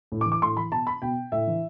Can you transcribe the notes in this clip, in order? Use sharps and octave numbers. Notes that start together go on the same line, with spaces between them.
A2
D6
E3
D6
A2 C6
E3 B5
B2 A5
B5
B2 G5
A2 E5
E3